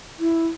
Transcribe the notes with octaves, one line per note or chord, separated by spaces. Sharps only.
E4